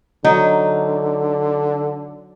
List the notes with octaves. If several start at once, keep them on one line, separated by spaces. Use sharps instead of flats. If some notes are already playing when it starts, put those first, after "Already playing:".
D3 F#3 D#4